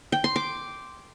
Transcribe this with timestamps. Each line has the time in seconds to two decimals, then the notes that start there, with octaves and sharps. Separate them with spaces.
0.12 G5
0.24 C6
0.36 D6